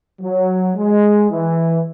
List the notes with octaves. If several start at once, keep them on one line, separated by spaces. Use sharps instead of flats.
F#3
G#3
E3